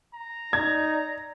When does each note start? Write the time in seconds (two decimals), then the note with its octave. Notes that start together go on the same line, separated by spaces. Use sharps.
0.14 A#5
0.53 D#4 D5 G#6